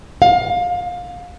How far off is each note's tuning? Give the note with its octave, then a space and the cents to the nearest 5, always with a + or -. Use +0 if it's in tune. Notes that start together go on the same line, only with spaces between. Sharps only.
F5 +25